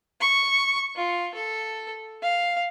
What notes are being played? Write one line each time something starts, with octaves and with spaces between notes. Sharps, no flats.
C#6
F4
A4
F5